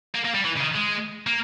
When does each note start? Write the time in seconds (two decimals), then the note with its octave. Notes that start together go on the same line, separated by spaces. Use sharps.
0.14 A#3
0.25 A#3
0.35 G3
0.45 E3
0.57 C#3
0.61 D#3
0.76 G#3
1.27 A#3